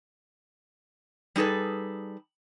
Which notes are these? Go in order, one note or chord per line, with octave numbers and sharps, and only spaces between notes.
G3 D#4 G#4 A4 B4